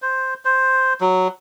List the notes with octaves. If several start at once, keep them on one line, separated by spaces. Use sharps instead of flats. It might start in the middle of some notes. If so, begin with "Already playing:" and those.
C5
C5
F#3